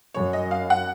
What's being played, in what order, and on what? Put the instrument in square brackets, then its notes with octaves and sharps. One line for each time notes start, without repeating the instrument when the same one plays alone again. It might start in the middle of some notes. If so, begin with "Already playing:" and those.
[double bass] F#2 [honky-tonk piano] C#5
[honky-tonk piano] D#5
F5
F#5